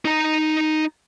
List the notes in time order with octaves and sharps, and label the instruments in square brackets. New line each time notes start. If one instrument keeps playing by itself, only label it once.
[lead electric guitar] D#4 A#5